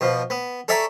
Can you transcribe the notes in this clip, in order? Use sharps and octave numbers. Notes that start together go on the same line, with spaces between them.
B2 F3
B3
A4 C#5 D5 E5 G#5 A#5